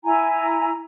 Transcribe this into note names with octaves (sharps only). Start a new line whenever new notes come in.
E4 G#5 A#5